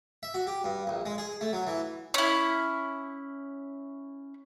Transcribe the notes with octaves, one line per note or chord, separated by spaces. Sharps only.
E5
F#4
G4
G2
A#1
G#3
G#4
A3
F#3
E3
C#4 E4